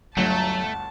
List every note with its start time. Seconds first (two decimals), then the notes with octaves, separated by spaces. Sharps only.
0.17 G1 D2 F#3 A3 A5